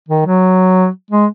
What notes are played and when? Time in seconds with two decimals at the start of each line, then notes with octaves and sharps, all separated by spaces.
0.09 D#3
0.26 F#3
1.11 G#3